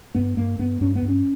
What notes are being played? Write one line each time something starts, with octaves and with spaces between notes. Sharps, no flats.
G2 B3
G2 A#3
G2 B3
G2 C#4
B3
G2
C#4